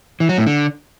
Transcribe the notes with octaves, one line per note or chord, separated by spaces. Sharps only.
E3
F#3
A2
D3